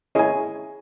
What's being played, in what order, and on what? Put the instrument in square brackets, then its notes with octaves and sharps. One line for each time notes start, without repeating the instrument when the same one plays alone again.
[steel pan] E4 G#4 C#5 [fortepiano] D#5 G#5